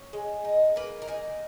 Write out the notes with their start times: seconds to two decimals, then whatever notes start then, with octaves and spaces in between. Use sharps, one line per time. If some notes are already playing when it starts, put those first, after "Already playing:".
Already playing: C#4
0.13 G#3
0.45 D#4
0.76 A#3 B4
1.02 A#4
1.07 D#4 G#4